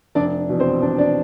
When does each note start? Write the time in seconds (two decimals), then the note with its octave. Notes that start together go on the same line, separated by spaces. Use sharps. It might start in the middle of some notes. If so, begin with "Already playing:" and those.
0.15 F1 D4 D5
0.49 E2 B2
0.60 C4 C5
0.81 F1 D4 D5
0.98 D4 D5